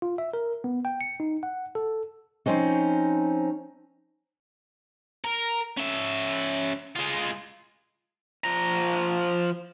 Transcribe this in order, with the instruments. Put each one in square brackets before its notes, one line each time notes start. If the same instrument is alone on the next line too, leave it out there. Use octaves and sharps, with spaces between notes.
[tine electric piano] F4
E5
A#4
B3
G5
C#7
D#4
F#5
A4
[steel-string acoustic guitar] F3 C4 C#4 D#4
[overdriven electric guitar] A#4
C#4 E5
G#3 F4
[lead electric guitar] F3 A#5